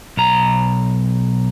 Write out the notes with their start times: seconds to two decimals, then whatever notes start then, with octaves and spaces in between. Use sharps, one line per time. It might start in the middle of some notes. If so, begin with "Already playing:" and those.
0.17 B1 A#5